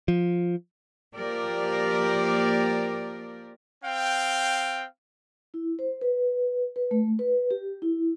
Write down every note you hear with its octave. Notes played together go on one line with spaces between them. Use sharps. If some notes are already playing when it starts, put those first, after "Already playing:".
F3
F3 A#3 G4 A#4 D5
C4 F5 G5
E4
C5
B4
B4
A3
B4
G4
E4